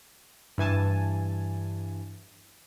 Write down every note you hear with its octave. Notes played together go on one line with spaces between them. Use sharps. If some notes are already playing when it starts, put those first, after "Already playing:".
G2 E3 G#5 A5